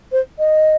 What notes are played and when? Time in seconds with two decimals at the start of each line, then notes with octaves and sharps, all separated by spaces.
0.12 C5
0.39 D#5